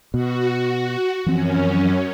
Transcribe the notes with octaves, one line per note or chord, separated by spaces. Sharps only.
B2 F#4
F#2 E3 F3 C4 C#4